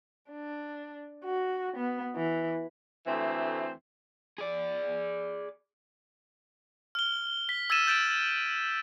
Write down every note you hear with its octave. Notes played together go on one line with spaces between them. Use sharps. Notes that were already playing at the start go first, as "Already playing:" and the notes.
D4
F#4
B3
E3
D2 E3 A3 C4 C5
G#4 D5
F6 G7
B6
E6 G#6 A6 B6 D#7 E7
G6 A6 D7 E7 F#7